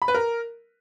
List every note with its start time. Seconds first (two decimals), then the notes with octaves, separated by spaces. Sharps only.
0.02 B5
0.08 B4
0.14 A#4